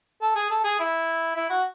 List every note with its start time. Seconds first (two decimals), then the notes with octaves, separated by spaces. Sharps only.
0.22 A4
0.36 G#4
0.50 A4
0.64 G#4
0.79 E4
1.36 E4
1.50 F#4